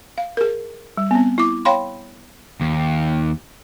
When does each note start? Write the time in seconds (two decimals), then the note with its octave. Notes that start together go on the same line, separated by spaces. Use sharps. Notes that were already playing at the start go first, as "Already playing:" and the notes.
0.18 F5
0.37 G#4 A#4
0.97 G3
1.11 B3 C4
1.38 E4 D6
1.65 C#5 F5 G5 B5 C6
2.61 D#2